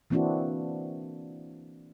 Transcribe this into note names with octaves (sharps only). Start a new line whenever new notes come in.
E3 A#3 C4 D4 E4 F#4